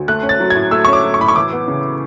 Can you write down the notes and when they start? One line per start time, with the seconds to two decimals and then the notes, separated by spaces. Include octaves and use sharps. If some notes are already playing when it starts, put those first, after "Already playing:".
Already playing: D2
0.08 A3 F#6
0.23 C#4
0.29 A6
0.40 F#3
0.50 G#6
0.55 A2
0.71 A3 E6
0.85 C#6
0.88 C#4
0.93 D6
1.04 F#3
1.14 C#6
1.19 A2 B5
1.28 C#6
1.36 E3 D6
1.53 B3
1.68 C#3